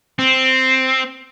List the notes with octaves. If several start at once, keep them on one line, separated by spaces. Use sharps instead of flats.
C4